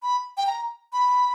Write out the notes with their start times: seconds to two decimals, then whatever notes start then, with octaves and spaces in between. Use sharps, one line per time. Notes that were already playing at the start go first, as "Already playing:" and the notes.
0.03 B5
0.37 G5
0.47 A#5
0.93 B5